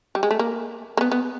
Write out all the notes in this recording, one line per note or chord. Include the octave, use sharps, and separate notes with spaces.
G3
G#3
A3
A#3
A#3
B3
B3